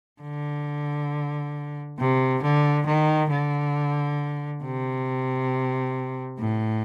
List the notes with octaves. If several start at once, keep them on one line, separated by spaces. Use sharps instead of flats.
D3
C3
D3
D#3
D3
C3
A2